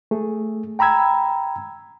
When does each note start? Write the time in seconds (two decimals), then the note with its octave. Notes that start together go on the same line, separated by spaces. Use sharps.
0.11 A3 G#4
0.79 G5 A#5 B5 E6 G#6